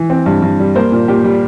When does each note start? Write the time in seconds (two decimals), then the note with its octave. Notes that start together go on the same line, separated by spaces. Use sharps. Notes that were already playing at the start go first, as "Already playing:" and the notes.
Already playing: E3
0.10 C4
0.26 G2
0.42 G2
0.60 G3
0.75 A#3 C5
0.92 A#2
1.08 A#2 G4
1.24 G3